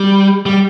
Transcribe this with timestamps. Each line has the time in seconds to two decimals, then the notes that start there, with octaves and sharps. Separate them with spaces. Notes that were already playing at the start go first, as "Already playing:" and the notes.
Already playing: G3
0.46 G3